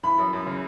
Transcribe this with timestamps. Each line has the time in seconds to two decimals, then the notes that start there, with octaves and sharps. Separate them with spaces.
0.03 E3 B5
0.18 F#2
0.33 F#2
0.47 C#3